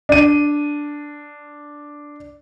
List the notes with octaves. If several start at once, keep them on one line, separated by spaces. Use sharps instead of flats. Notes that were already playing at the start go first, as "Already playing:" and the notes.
D4 D#7